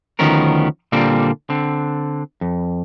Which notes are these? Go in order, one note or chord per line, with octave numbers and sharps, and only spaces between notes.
D2 D#3 F3 B3 C#4 A#4
A#2 D3 G3 A#3 C4
D3 C4
F2